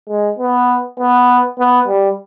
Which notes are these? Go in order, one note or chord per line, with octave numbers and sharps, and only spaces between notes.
G#3
B3
B3
B3
G3